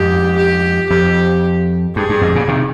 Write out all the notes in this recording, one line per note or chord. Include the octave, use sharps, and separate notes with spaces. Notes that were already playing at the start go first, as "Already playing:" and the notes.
Already playing: F2 G#2 G4
G4
F2 G4
G2 G#4
G2
F2 G#2
A#2 C#3
C3 D#3